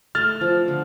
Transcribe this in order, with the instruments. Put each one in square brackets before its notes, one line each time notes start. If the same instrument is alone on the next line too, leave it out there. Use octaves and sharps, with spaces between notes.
[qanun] A3 [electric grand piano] F6 A6
[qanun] F3
D3